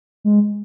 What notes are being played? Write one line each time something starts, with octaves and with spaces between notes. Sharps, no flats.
G#3